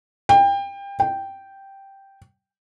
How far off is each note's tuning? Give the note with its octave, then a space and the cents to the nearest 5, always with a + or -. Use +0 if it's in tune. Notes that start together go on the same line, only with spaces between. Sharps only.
G5 +25
G5 -5